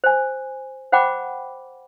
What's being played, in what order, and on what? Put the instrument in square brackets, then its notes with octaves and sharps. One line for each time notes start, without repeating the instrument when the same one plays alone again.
[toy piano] C5 G#5
C5 F#5 G5 B5 D6